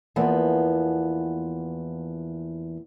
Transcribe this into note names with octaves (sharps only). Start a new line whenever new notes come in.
E2 E3 F3 A#3 B3